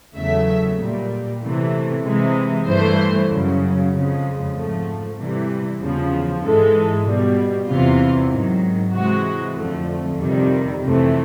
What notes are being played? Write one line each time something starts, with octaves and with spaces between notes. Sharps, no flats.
E2 C#3 F#3 A3 E5
A#2 G3
C3 E3 A3
C3 E3 G#3
G2 E3 A3 C5
F#2 C#3 F#3
F2 C#3 F3 G#3
G#2 F3 A3
C3 E3 G3
E2 C#3 F3
G#2 E3 G#3 A4
B2 G3
E2 C3 E3 F4
G#2 D#3 F#3
C3 E3 G#3 F#4
F2 D3 F3 A3
F2 C3 D#3 G3
F2 C3 E3 A3